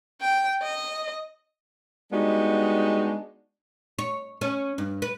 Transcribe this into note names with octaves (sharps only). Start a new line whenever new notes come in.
G5
D#5
G3 G#3 B3 D4 D#4 F#4
C#5
C#4
G2
B4